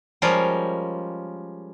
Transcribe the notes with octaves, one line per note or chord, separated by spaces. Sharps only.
F3 G3 G#3 C#4 F4 A#4